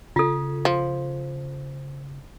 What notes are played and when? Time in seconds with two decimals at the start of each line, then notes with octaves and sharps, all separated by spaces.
0.16 C#3 F4 A4
0.65 F3